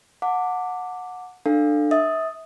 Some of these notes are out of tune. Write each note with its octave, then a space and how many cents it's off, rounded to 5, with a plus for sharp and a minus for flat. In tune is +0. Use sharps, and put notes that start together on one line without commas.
F#5 -20 A5 +30 D6 +0
D4 +25 A4 +5 F5 +0
E5 -30 D#6 +0